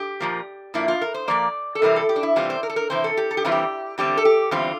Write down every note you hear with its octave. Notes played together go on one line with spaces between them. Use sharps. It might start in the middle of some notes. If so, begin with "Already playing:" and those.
Already playing: G4
A#2 F3 A#3
A#2 F3 A#3 E4
F4
A#4
C5
A#2 F3 A#3 D5
A4
C3 E3 G3 C4 A#4
A4
G4
D4
E4
C3 E3 G3 C4 F4
C5
A#4
A4
A#4
C3 E3 C4 C5
A4
G4
A4
G4
C3 E3 G3 C4 F4
G4
E2 D3 G3 C4 G4
A4
G4
E2 D3 G3 C4 F4